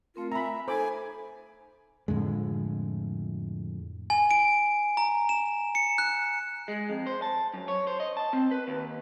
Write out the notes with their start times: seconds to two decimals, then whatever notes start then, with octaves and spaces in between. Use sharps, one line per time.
0.16 A3 C4 F4 A#4
0.32 E5 G#5 A#5 B5 E6
0.68 D#4 A4 C5 G#5 B5 D6
2.08 F2 A2 D3 G#3
4.10 G#5
4.31 D7
4.97 A#5
5.29 E7
5.75 C#7
5.98 F#6
6.68 G#3
6.90 F2
7.07 C5
7.22 A5
7.54 F#2
7.68 C#5
7.87 C5
8.00 D#5
8.17 A5
8.33 C4
8.51 B4
8.68 D#2